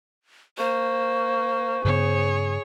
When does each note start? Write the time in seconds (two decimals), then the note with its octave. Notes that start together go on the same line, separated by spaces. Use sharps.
0.58 A#3 C5 C#6
1.85 G2 C#3 B3 G#4 C#5